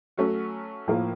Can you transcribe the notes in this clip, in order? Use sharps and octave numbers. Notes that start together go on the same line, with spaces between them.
F#3 A3 C#4 F#4
A2 F3 A#3